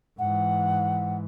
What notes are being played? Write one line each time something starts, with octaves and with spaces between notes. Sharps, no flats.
G#2 E3 F#5